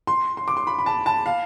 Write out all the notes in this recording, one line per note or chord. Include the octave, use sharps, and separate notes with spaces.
C6
C6
D6
C6
B5
B5
A5
A5
F5